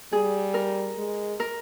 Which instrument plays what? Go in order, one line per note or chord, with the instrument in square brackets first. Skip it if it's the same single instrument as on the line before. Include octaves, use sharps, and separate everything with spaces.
[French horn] G3 [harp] G#4
[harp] A#4
[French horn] G#3
[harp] A#4